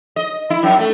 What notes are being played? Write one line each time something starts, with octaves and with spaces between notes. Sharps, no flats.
D#5
E4
F#2
A3